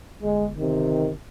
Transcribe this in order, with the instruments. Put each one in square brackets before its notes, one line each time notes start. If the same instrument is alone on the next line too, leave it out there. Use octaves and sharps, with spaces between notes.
[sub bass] G1 [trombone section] G#3
[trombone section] C3 D#3